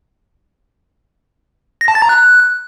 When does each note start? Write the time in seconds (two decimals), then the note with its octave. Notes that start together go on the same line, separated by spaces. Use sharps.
1.81 A#6
1.88 A5
1.95 A6
2.02 A#5
2.09 F#6